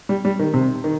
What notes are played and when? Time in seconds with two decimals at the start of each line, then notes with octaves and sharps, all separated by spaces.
0.09 G3
0.25 G3
0.39 D#3
0.54 C3
0.84 D#3